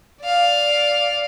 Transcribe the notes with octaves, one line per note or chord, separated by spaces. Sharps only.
D5 F5